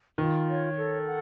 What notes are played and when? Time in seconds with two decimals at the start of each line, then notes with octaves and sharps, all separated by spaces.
0.18 D#3 F4
0.47 C#5
0.76 A4
1.06 F#5